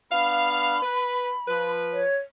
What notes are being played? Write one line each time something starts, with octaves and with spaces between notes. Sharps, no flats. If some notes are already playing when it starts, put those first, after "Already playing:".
B3 D4 F5 B5
B4
F3 B4
C#5